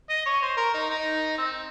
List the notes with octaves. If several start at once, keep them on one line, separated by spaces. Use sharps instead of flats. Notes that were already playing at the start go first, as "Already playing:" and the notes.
D#5
C#5
C5
A#4
D#4
D#4
C4